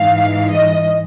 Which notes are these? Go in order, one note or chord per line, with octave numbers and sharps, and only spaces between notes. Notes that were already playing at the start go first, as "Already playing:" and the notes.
Already playing: G#2 E3 F5
D#5